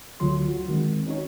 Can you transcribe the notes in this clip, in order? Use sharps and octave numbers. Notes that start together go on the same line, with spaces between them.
D2 D3 F#3 F4 C6
F#4
D#3 G#3 C4
C#4 D#4 F#4 C#5